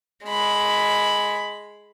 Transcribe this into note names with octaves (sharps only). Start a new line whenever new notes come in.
G#3 B5